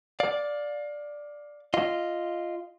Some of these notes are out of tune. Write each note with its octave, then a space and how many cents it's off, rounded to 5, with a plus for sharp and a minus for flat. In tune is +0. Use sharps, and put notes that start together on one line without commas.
D5 +0 F5 +25
F4 -10 D#5 +0